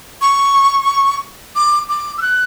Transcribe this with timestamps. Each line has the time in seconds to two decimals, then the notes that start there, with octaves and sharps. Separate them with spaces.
0.21 C#6
1.56 D6
1.89 D6
2.18 E6
2.22 F#6